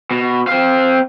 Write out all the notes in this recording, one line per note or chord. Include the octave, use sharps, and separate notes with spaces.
B2
C4 F5